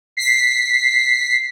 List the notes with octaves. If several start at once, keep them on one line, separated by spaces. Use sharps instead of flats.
B6 C7